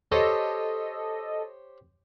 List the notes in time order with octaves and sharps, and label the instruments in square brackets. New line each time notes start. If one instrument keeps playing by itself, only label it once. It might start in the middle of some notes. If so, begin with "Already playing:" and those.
[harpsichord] G4 C5 C#5 [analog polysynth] A4 D#5